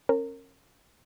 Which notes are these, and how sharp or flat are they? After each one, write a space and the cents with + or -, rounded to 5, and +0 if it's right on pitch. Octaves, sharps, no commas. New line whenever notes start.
C#4 -30 A#4 -20